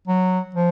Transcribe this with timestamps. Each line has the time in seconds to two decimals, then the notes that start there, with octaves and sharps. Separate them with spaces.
0.07 F#3
0.55 F3